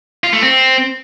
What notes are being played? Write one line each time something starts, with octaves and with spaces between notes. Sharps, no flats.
F4
A3
C4